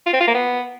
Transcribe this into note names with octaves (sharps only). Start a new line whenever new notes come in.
F4
C4
F4
A#3
B3